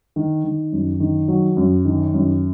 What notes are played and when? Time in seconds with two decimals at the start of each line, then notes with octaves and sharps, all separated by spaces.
0.16 D#3
0.44 D#3
0.72 F#2
1.00 D#3
1.28 F#3
1.57 F#2
1.85 D#3
2.14 F#2